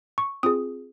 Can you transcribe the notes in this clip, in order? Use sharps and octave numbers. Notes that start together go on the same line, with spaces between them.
C#6
C4 F4 G#4 D#6